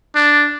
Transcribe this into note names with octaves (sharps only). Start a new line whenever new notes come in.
D4